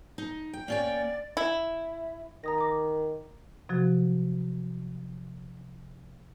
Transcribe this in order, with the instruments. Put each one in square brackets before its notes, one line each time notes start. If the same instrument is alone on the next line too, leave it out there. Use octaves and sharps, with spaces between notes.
[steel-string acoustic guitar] D#4
G5
[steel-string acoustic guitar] A#3 C#4 G5 [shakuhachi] D5
[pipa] E4
[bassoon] D#3 [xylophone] A#5 D#6 A#6
[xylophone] D6 A#6
[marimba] C3 F3 F#3 F#4